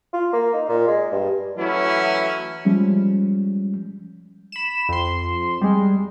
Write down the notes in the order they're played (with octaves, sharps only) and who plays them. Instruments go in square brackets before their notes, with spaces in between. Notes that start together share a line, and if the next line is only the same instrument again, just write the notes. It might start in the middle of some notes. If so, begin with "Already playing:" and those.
[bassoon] F4
A#3
D#4
A#2
G#3
G2
[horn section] E3 F#3 A3 C#4 E4
[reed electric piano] F3 G3 G#3 C#4
[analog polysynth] B5 E7
F2 C6
G3 G#3